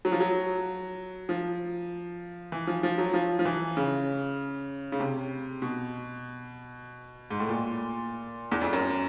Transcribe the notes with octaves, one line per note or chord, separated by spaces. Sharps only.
F#3
F3
F#3
F3
E3
F3
F3
F#3
F3
F3
E3
C#3
C#3
C3
B2
G#2
A2
A#2
E2
F2
F#2